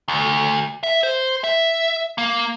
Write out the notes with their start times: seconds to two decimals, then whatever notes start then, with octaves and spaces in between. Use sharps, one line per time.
0.08 D2
0.83 E5
1.03 C5
1.44 E5
2.18 A#3